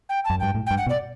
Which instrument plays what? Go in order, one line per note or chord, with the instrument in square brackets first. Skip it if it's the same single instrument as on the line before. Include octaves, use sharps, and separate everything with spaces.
[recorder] G5
A5
[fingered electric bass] F#2
[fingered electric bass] G2 [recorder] G5
[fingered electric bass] A2
[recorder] G5
[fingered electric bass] G2
[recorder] F#5
[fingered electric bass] B2
[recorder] D5